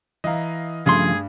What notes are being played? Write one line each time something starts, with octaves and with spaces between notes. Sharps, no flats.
E3 D#5 F5 A#5
G2 C#3 F3 G3 A3 G#4 C6